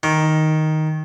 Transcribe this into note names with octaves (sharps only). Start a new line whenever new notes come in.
D#3